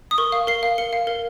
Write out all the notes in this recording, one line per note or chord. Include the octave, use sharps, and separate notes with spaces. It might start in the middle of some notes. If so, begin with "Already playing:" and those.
D#6
A#4 C#6
F5
A#4 C7
F5
A#4 C#7
F5
A#4